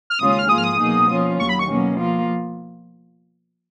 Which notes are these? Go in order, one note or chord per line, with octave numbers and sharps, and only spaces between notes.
F6
D#2 C#3 G#3 C#4 F4 D#6
D#6
F6
G#2 F3 A#3 F4 G#4 D#6
F6
D#6
B2 F#3 A#3 D#4 G#4
F3 A#3 C#4 F4
D#2 D#3 F#3 C#6
B5
C#6
B2 F#3 A#3 C#4
F3 A#3 F4